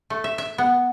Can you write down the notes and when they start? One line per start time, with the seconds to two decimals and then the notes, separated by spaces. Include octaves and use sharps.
0.10 A3
0.24 E5
0.38 E5
0.58 B3